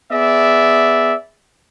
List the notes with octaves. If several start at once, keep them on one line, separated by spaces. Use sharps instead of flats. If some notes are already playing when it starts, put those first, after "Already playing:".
B3 G#4 D5 E5